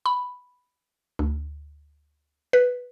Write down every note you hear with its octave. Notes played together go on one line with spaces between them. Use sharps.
B5
D2
B4